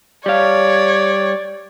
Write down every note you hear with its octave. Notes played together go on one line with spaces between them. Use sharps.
G3 C#5 D5 F5